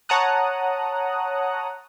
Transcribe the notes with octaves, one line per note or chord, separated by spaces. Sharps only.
C#5 F#5 A5 A#5 D#6 F#6